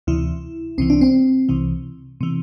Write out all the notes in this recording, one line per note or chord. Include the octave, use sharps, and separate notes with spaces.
D2 C3 E3 E4
C2 C3 E3 C4
D4
C4
C2 C3 E3
C3 E3